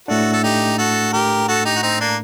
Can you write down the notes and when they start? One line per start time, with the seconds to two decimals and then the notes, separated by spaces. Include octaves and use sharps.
0.08 A2 A3 D4 F#4 A4
0.33 A4
0.43 D#4 G4
0.78 F#4 A4
1.13 G4 A#4
1.48 F#4 A4
1.65 D#4 G4
1.76 F#4
1.83 C4 D#4
2.00 A#3 D4